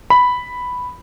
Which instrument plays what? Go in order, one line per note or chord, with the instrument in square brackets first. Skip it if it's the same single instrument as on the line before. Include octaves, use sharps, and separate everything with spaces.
[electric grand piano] B5